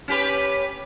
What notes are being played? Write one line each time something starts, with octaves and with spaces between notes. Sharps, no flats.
C#4 G4 B4